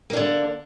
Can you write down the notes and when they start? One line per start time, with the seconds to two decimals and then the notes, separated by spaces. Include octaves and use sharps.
0.10 A#3
0.13 D4
0.17 D3